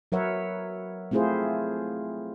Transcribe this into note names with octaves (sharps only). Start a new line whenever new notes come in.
F#3 A#4 B4 C#5 E5 F#5
A3 C4 E4 F4 G#4 C5